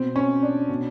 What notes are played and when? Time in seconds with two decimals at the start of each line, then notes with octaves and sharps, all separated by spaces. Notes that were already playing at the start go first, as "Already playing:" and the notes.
Already playing: B2 C4
0.16 C#4
0.42 D4
0.69 B2